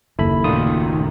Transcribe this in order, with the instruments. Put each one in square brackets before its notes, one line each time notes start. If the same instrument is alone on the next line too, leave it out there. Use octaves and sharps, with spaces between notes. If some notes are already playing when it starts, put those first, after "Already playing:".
[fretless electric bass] F#1 D#2 [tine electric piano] E4 A4 B5
[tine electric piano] A#2 F4 D#6 [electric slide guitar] D#3 A3